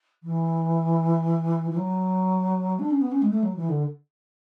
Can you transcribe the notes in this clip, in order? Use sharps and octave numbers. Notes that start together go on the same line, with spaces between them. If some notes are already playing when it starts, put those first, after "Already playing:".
E3
E3
F#3
D4
C#4
B3
C#4
G#3
A3
F#3
E3
D3